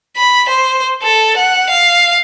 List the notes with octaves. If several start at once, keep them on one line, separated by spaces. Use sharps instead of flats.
B5
C5
A4
F#5
F5